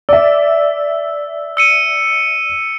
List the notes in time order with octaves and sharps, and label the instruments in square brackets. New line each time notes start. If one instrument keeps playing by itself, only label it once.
[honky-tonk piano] D5 E5 [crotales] E6
[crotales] E6 C#7 D#7